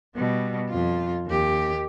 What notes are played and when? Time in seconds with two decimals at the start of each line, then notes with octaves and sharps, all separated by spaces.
0.15 B2 G3
0.69 F2 F4
1.26 D#2 G4